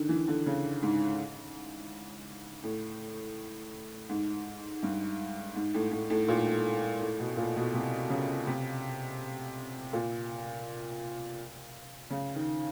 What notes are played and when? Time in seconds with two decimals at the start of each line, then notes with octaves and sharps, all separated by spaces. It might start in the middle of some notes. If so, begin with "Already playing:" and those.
Already playing: D3 D#3
0.09 E3
0.28 D3
0.46 C#3
0.83 G#2
2.63 A2
4.09 G#2
4.83 G2
5.55 G#2
5.74 A2
5.91 A2
6.10 A2
6.28 A#2
7.01 A2
7.20 B2
7.37 A#2
7.56 B2
7.74 C3
8.10 C#3
8.47 C3
9.93 A#2
12.10 C#3
12.36 D#3